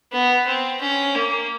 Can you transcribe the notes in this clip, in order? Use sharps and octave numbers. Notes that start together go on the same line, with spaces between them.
B3
C4
C#4
A#3